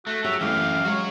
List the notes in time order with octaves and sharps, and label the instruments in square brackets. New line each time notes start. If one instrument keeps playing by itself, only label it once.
[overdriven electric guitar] A3 [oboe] F#4
[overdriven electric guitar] F#3 [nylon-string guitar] G4 G#4 C#5 [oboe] E5
[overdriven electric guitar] F#2 G4 [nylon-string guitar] E3 A3 A#3 [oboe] F5
[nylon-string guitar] F#3 G#3 C#4 [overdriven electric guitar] F#4 C#5